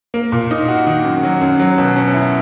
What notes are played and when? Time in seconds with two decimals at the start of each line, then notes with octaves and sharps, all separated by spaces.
0.14 A#3
0.32 A#2
0.51 D#4
0.68 F#4
0.87 D#3
1.05 F#2
1.23 F#3
1.41 F#2
1.59 F#3
1.78 B2
1.96 C#4
2.14 E4